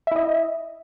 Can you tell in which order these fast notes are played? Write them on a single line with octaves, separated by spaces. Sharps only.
E5 E4 D#5